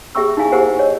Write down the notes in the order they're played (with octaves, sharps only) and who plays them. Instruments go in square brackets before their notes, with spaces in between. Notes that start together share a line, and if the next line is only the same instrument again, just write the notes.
[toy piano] G4 G#4 E5 G5 C#6 E6
D#4 E4 G#4 F5 G#5
G4 G#4 A#4 C5 F#5 G#5
C#5 D#5